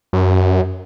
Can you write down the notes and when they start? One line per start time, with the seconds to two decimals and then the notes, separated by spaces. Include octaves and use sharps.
0.13 F#2